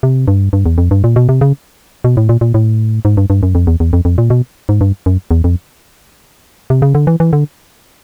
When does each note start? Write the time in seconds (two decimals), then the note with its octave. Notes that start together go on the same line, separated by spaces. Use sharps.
0.03 C3
0.28 G2
0.53 G2
0.66 E2
0.78 F2
0.91 G2
1.04 A#2
1.16 B2
1.29 C3
1.41 C#3
2.04 B2
2.17 A2
2.29 A#2
2.41 A#2
2.54 A2
3.05 G#2
3.17 G2
3.30 G2
3.43 F#2
3.55 F2
3.67 E2
3.80 E2
3.93 F2
4.05 F2
4.18 A#2
4.30 B2
4.69 G#2
4.81 G2
5.06 F#2
5.31 E2
5.44 F2
6.70 C3
6.82 C#3
6.95 D3
7.07 E3
7.20 E3
7.33 D3